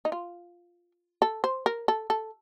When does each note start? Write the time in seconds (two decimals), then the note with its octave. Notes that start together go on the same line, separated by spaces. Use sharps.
0.05 D#4
0.12 F4
1.22 A4
1.44 C5
1.66 A#4
1.88 A4
2.10 A4